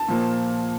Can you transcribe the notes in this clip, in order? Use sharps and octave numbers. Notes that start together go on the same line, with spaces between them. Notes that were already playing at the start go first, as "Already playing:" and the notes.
Already playing: A5
A#2 F3 A#3